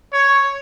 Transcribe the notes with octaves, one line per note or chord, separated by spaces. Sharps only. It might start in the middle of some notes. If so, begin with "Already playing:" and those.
C#5